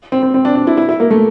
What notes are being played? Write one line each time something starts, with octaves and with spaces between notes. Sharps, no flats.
C4
C4
C4
D4
D4
E4
E4
E4
A#3
A3